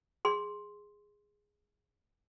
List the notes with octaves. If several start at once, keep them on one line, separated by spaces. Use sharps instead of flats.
G#4 C6